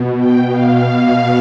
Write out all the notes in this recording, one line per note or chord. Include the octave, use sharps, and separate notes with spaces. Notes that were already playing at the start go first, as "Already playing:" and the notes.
Already playing: B2
G5
F5